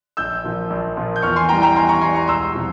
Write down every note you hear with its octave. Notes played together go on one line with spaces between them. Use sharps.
A#1 E6 G6
A#2 F3
A#1
A#2 F3
G6
E2 C#6 F6
G#5 C6
E3 G3 G5 A#5
G5 A#5
E2 G#5 C6
A#5 C#6
E3 G3 G#5 C6
A#5 C#6
E1 C6 E6
C3 F3